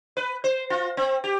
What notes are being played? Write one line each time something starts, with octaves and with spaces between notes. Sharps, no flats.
B4
C5
F4
C4
G4